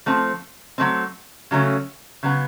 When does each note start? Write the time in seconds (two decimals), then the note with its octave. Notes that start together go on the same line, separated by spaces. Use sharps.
0.06 F3 A3 C4
0.78 F#3 A3 C4
1.51 C#3 F#3 A3 C#4
2.23 C#3 F#3 B3